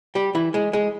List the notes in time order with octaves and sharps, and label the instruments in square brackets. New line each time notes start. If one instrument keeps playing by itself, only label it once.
[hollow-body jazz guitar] G3 G4
E3 E4
G#3 G#4
G#3 G#4